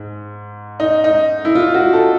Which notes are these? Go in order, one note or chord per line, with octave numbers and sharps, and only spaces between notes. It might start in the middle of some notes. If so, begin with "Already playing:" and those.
Already playing: G#2
D#4
D#4
E4
F4
F#4
A4